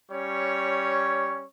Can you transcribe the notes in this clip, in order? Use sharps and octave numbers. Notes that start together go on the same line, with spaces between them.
G3 C#4 C#5